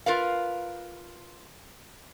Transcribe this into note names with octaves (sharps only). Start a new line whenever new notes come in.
F4 A#4 B4 F5